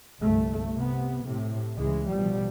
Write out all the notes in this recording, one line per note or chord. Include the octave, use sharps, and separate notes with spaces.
G1 C2 A3
C3 B3
A2 C3
C#2 C#3 E3 G#3
A1 B2 F3 G3